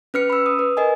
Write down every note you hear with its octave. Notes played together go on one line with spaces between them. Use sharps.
C#4 B4 F6 C#7
B5 E6
D#6
B4
A#4 D#5 G#5